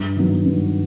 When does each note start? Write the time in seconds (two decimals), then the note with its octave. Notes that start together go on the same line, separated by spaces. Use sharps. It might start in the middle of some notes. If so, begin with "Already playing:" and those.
Already playing: G2
0.17 D#3 F#3 B3
0.45 G2